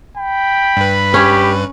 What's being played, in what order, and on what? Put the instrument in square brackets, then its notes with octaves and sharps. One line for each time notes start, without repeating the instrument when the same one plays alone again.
[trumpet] G5 [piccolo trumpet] B5
[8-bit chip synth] G2 B4
[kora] C#4 C#5 [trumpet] G4